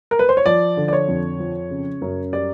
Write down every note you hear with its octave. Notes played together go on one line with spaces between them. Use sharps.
A#4
B4
C5
C#5
F3 D5
D3
D5
C#5
F2
F3
C#3
F#2
G3 D5